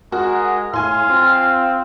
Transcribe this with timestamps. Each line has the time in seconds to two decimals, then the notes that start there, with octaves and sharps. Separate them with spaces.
0.12 G#3 F#4 A#4
0.74 A2 F5 G#5 C6
1.10 C4 F4